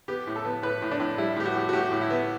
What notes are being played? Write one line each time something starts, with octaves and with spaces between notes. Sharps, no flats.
B3 G4
A2
A4
B3
A2 B4
A2
D4
A2
G3 E4
A2 G4
F#4
A2
F#4
A2 G4
A2
E4
B3